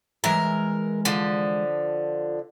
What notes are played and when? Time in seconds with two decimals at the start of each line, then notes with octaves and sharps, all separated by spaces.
0.24 E3 G#3 A#4 E5
1.05 D3 F3